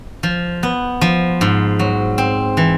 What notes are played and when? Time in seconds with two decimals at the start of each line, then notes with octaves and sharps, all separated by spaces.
0.23 F3
0.63 B3
1.01 F3
1.41 G#2
1.79 F#3
2.18 C4
2.57 E3